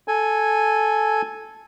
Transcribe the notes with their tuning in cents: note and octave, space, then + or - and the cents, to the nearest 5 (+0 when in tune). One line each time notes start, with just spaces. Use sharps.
A4 -10 G#5 +0